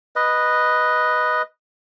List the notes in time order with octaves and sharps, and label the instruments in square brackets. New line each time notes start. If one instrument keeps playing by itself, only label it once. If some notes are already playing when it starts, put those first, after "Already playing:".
[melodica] B4 D#5